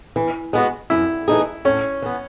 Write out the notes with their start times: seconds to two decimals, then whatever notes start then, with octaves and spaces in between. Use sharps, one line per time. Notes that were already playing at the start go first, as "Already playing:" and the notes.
0.16 E3
0.53 G#3 B3 F#4
0.90 F#2 E4
1.28 E3 A3 D#4 G#4
1.65 A2 C#4
2.02 E3 B3